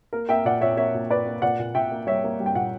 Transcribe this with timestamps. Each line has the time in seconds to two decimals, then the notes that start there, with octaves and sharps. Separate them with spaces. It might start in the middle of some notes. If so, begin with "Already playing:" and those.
0.13 A#3 A#4
0.29 A#3 E5 G5
0.45 A#2 D5 F#5
0.61 A#2 C#5 E5
0.77 A#3 C#5 E5
0.94 A#2
1.10 A#2 B4 D5
1.26 A#3
1.42 A#2 D5 F#5
1.59 A#2
1.75 A#2 E5 G5
1.92 A#3
2.07 G3 C#5 E5
2.24 A#3
2.40 G3
2.46 G5
2.55 A#2 F#5